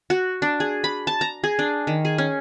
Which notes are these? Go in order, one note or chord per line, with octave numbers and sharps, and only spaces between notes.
F#4
D4
G#4
B5
A5
A#5
G#4
D4
D#3
G#4
C#4